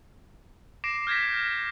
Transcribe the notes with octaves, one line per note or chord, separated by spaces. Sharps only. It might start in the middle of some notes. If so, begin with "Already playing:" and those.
D6 A#6 C7 D7 E7
F6 G6 G#6 A#6 B6